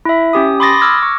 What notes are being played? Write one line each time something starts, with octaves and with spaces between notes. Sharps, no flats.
E4 E5
C#4 G4 D#6
B5 C6 D6 D#6 A6 A#6
D6 E6 F6 G#6 A#6
C#6